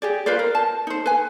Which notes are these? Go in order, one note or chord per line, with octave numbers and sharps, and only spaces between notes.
G4 G#4 D5
F4 B4 C5 D5
A#4
A5
D#4 C5
B4 G#5